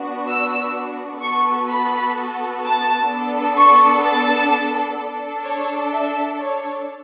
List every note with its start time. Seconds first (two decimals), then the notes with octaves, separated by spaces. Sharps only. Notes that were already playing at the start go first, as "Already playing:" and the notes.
Already playing: B3 D4 F#4
0.28 E6
1.21 B3 F#4 A4 C#6
1.69 B5
2.63 A5
3.10 B3 D4 A4
3.57 C#6
4.04 A5
4.99 D4 A4
5.46 C#5
5.93 E5
6.40 C#5